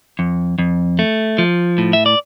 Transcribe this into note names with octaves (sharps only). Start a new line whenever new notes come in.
F2
F2
A3
F3
A2
E5
D5